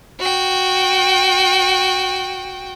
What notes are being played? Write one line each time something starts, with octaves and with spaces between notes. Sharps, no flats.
F#4 G5